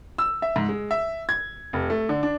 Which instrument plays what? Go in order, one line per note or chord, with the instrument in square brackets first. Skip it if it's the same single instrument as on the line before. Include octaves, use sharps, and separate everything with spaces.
[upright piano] E6
E5
G#2
G#3
E5
G#6
F1
A3
D3
D4